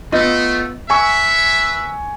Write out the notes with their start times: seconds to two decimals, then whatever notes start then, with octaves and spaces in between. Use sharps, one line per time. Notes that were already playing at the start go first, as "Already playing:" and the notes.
0.12 A3 B3 F4 D#5
0.90 B4 E5 G#5 C#6